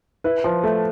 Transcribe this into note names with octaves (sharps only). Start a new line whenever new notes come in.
E4 B4
F3
A3